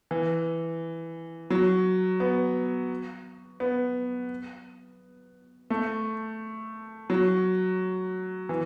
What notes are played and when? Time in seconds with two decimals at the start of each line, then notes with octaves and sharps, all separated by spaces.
0.11 E3
1.50 F#3
2.20 B3
3.60 B3
5.70 A3
7.10 F#3
8.49 E3